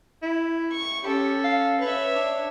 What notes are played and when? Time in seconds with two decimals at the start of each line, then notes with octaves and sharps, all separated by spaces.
0.22 E4
0.72 C#6
1.03 C#4 G4 A4
1.44 F5
1.81 B4 C#5 E5
2.15 D4